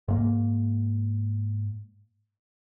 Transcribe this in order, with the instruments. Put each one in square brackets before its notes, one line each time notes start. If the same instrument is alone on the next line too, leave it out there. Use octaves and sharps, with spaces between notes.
[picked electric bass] G#2 A#3